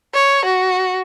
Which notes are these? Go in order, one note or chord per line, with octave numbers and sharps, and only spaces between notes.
C#5
F#4